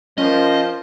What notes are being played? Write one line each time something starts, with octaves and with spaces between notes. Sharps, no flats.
F3 C#4 A#4 C5 D#5